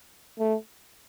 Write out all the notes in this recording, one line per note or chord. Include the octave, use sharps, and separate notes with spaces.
A3